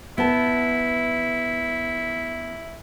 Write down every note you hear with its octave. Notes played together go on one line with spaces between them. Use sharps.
B3 E4 A5